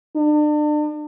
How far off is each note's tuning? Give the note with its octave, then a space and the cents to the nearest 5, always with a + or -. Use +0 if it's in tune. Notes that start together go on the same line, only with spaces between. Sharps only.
D4 +40